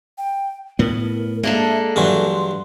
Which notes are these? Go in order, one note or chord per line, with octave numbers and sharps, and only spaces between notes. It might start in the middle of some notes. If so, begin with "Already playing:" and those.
G5
A2 B3 A#4
G#3 A#3 D4 A4 E5
G2 E3 F#3 C6